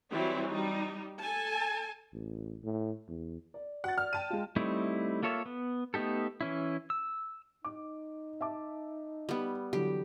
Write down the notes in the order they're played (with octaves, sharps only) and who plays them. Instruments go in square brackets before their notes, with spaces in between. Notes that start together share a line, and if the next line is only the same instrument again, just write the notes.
[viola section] E3 F#3 G3 C4 E4
G3 D#4
A4 G#5 A5
[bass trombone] A1
A2
E2
[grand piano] D5
[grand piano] F#4 A6 [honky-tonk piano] F#5
[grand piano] D5 [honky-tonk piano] F6
[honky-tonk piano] G5 A5 D#7
[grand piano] G#3 F4
[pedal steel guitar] G3 A3 C4 D#4 E4
A#3 F4 A4 C#5 E5
B3
A3 B3 D#4 G4 A4
E3 C#4 E4
E6
[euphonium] D#4 [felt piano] D6
[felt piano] E5 A5 D6
[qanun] G3 B3
[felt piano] D3 E3 F#3 [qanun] G4